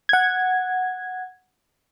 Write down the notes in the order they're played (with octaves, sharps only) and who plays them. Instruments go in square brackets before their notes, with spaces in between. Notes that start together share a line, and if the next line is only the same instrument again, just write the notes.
[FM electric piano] F#5 G#6